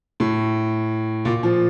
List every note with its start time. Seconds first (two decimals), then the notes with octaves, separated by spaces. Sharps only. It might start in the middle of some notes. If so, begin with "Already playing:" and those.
0.20 A2
1.25 A#2
1.43 F3